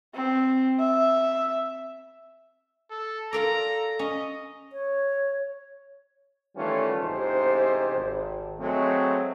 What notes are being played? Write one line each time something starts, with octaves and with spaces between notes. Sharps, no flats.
C4
E5
A4
F4 A4 A#4 D5 A#5
C#4 D#5
C#5
D#3 E3 G3 A3 C#4 F4
A1 G#2 C3 G4 C5
G#1
F#3 G#3 A3 C4